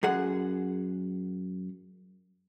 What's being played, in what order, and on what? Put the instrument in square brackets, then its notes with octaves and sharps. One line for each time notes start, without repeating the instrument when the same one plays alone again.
[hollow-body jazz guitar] F#2 G#4 F#5